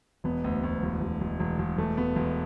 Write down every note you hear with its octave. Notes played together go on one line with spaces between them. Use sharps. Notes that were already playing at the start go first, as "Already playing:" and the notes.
E1 B3
D2
D2
E1
E1
E1
E1
E1
E1 A3
E1 B3
E1